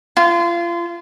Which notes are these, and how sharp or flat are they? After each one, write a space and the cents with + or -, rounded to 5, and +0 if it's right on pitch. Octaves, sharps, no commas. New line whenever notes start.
F4 -30